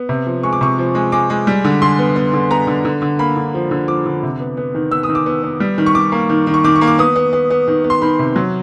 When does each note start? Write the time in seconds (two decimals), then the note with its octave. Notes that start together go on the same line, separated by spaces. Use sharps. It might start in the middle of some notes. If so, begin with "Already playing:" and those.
Already playing: B3
0.09 C3
0.27 F3
0.43 G#3 C#6
0.53 D6
0.61 C3 C#6
0.78 F3
0.95 G#3
1.12 G#3 D6
1.30 G#3
1.47 G3
1.64 D3
1.82 D3 C6
1.99 B3
2.16 B3
2.33 D3
2.50 B3 A#5
2.67 D3
2.85 D3
3.02 D3
3.19 A#3 B5
3.37 D3
3.54 F3
3.71 D3
3.88 F3 D6
4.06 D3
4.23 C3
4.40 B3
4.57 B3
4.75 D#3
4.91 B3 E6
5.03 D#6
5.09 D#3
5.15 D6
5.26 B3
5.43 B3
5.60 G3
5.78 D#3
5.86 C#6
5.95 D#3 D6
6.12 A#3
6.30 D#3
6.47 D#3
6.54 C#6
6.64 D#3 D6
6.76 C#6
6.81 A#3
6.87 D6
6.98 B3 D#6
7.16 B3
7.33 B3
7.50 B3
7.68 D#3
7.84 B3
7.90 C6
8.02 D#3 B5
8.19 C3
8.36 F#3